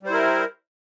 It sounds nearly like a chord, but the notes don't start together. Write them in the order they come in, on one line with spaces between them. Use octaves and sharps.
G3 C5 E4 A#4